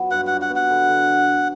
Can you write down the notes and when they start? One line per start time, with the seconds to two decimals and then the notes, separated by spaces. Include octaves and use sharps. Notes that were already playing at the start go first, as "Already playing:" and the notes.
Already playing: F#3 B3
0.11 G2 F#5
0.27 F#4 F#5
0.41 F#5
0.50 B3
0.56 F#5
0.70 D3
0.89 D3